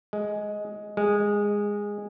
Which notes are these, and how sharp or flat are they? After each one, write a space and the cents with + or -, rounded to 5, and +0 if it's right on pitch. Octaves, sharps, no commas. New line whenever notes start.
G#3 +5
G#3 -15